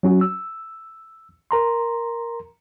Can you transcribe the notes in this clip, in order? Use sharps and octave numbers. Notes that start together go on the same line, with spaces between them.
F#3 C#4 F#4
E6
A#4 A#5 C6